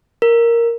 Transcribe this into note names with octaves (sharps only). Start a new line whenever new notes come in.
A#4